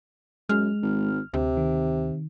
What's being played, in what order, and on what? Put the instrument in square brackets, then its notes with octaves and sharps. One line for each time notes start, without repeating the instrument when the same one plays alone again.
[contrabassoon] F#2 [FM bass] G#3 [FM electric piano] F6
[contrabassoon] G#1
[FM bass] D2 [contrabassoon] C3
[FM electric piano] D#3